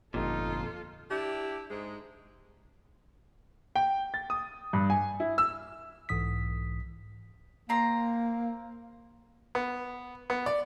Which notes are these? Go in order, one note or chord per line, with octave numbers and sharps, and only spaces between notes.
G1 F2 A#2 D#4 F4 A4
D4 E4 G4
G#2 G#3
G5
A6
D#6
G2
G#5
E4
E6
B1 G#2 E3 D#6 B6
A#3 C4 A#5 C6
B3
B3
D5